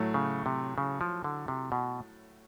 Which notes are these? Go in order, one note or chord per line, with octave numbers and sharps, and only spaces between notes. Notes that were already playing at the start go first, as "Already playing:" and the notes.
Already playing: A2 F#3 A3
C#3
C3
C#3
F3
D3
C3
B2